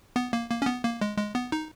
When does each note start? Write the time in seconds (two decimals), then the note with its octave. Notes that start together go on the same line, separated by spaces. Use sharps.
0.16 B3
0.33 A#3
0.50 A#3
0.62 C#4
0.66 B3
0.84 A#3
1.01 G#3
1.18 G#3
1.35 B3
1.52 D#4